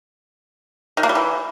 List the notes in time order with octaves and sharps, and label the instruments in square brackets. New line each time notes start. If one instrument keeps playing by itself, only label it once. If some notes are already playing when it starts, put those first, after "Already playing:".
[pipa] D#3
A#3
G3
E3